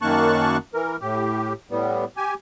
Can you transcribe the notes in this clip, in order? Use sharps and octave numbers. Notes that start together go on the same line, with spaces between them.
F#2 D#3 A#3 A5 C#6 F#6
E3 A#4
A2 G4
A2 G3 B3
G4 G#5